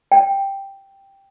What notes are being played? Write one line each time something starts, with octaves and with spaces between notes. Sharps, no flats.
G5